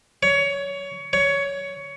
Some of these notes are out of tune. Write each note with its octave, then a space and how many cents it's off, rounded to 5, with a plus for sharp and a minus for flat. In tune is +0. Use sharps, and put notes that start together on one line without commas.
C#5 +20
C#5 +15